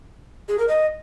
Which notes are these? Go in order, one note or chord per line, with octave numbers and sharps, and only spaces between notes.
G#4
A#4
D#5